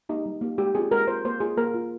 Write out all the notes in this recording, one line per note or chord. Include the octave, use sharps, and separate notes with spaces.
A#3 D#4 G4
G3
A#3 D#4 G4
G#3 G4
C4 F4 G#4
G#3 A#4
C4 F4 C5
A#3 C5
F4 G#4
A#3 A#4
F4